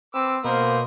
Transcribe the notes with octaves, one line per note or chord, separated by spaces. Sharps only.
C4 B4 D6 E6
B2 A#3 A#4 C5 B5 D#6